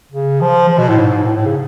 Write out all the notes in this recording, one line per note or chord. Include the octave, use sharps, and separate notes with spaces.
C#3
F3
F3
B2
A2
G#2
A2
A2
C#3